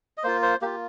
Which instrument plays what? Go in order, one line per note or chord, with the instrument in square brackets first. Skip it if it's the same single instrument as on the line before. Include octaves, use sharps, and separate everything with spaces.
[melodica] D#5
A#3 F4 C5
C5
A#3 F4 G4